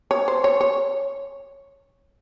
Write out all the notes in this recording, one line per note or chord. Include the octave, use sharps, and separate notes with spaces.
C#5
C5
C#5
C#5